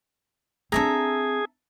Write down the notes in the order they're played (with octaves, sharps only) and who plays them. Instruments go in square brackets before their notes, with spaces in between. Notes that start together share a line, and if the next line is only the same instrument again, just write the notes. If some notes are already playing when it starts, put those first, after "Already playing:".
[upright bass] C4 D4 [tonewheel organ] G#4 [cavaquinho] A4 E5 A#5